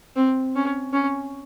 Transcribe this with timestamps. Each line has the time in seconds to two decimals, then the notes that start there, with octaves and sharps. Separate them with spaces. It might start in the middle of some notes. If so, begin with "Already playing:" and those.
0.16 C4
0.55 C#4
0.93 C#4